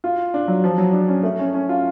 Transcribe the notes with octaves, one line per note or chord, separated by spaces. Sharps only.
F4
D4
F#3
F3
F#3
D4
C#4
A3
C#4
C#4
F4